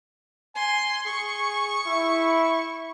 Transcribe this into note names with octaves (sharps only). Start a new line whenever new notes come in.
G#5 C6
G#4 C#6
E4